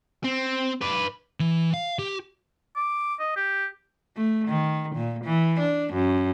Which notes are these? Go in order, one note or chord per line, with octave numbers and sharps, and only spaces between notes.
C4
B4 D5
E3
F5
G4
D6
D#5
G4
A3
D#3
A#2
E3
D4
F#2